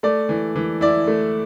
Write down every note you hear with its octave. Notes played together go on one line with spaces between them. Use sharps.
A3 D5
E3
E3
E4 D5
A3